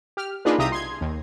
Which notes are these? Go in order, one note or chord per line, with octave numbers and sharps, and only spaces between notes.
G4 F6
A#3 D4 D#4 F4 G#4 B4
C2 F4 G4 E5 A#5 D#6
C6 G#6
D#2